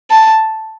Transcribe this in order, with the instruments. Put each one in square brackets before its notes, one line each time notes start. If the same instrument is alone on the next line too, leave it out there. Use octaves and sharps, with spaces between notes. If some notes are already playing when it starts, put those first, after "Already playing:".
[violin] A5